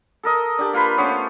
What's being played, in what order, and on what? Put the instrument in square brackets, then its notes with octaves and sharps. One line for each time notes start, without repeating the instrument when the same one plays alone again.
[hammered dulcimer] A4 A#4 D#5
D4 G4
A#3 F4 B4 B5
A3 B3 C#4 C5